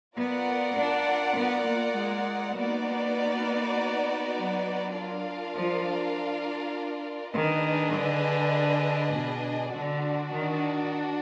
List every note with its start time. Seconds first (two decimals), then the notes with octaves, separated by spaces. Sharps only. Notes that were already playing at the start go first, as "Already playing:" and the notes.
0.17 B3 F4 A#4 D5 F#5
0.77 D4
1.37 B3
1.67 A#3
1.96 G#3
2.56 A#3 B3 D#4 F#4 D5
4.36 F#3
4.95 D4 F4 A#4 D5 F5
5.56 F3
7.34 D#3 D4 G#4 B4 D#5
7.94 D3
9.13 B2
9.73 D3 D4 F#4 D5
10.33 D#3